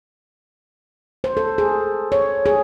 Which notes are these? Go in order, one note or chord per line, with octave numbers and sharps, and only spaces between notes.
C5
A4
G#4
C#5
G#4